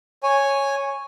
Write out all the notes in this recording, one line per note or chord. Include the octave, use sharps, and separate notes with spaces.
C#5 G#5